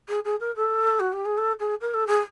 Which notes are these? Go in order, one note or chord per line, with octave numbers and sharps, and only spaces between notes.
G#4
G#4
A#4
A4
F#4
G4
G#4
A4
G#4
A#4
A4
G#4